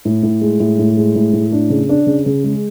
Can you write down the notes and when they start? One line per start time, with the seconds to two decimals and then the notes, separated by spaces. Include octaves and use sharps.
0.05 A2
0.23 A2
0.41 G#3
0.60 A2
0.79 A2
0.97 G#3
1.16 A2
1.33 A2
1.52 D4
1.70 C#3
1.89 D4
2.07 C#3
2.26 C#3
2.44 G#3